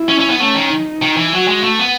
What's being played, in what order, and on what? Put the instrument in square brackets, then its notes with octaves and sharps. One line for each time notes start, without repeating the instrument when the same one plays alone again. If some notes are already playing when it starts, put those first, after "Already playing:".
Already playing: [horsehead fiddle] E4
[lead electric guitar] C#4
C#4
B3
[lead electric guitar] A3 [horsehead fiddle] C#4
[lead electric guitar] D#3
[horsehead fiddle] D#4
[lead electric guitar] D#3
E3
[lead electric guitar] F#3 [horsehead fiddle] F#4
[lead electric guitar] G#3
A3
B3